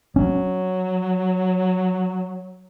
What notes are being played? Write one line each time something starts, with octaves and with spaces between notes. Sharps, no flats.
F#3 C#4